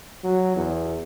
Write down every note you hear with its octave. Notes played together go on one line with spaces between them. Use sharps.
F#3
E2